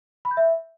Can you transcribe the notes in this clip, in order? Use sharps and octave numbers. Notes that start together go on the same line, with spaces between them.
B5
G6
E5